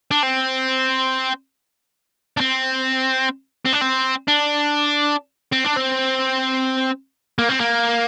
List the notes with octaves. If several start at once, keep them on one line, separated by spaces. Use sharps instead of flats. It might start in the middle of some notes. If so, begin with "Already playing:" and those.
D4
C4
D4
C4
C4
D4
C4
D4
C4
D4
C4
A#3
C4
A#3